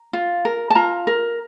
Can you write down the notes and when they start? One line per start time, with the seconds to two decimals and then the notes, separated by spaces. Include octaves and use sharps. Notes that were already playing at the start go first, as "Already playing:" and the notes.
Already playing: A#5
0.13 F4
0.45 A#4
0.70 A5
0.75 F4 A#5
1.07 A#4